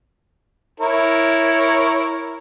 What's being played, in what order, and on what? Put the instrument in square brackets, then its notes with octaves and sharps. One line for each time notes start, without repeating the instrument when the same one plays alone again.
[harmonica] E4 A#4 C#5